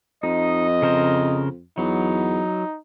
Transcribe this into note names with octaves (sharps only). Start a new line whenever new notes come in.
F2 D#4 D#5
C#3 A#4 C5
E2 F#3 D#4